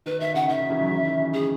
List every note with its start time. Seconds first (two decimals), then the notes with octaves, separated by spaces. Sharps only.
0.06 D#3 B4
0.20 D#3 E5
0.34 C#3 F#5
0.49 D#3 E5
0.59 D#3
0.70 C#3 E3
0.81 D#3 F#3
0.91 C#3 E3
1.05 D#3
1.20 C#3 E3
1.33 G#4